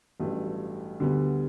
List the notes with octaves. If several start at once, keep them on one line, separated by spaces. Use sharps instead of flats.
A1 G2 F#3 A3
D2 D3 G3 B3